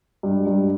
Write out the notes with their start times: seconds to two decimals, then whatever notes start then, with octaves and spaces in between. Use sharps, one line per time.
0.23 G2
0.47 G2